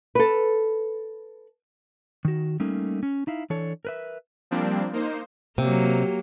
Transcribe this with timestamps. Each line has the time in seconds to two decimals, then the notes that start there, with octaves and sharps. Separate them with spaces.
0.15 A4 B4
2.25 D#3 F#4
2.60 G3 A3 A#3 C#4 D#4
3.03 C#4
3.27 D#4 E4 F5
3.50 E3 D4 A4 C#5
3.85 A#4 B4 E5
4.51 F3 G3 A#3 C4 D4
4.93 A#3 D#4 C5
5.58 C3 F#3 A#3